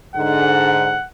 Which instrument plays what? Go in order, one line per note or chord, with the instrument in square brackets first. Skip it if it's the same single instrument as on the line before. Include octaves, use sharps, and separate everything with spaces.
[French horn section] G#2 D3 [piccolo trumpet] F#5